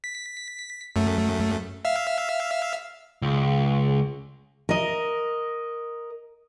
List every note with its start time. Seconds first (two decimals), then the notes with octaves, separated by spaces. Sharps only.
0.04 B6
0.96 F#2 A3
1.85 E5 F5
3.22 C#2
4.69 A#4 D#5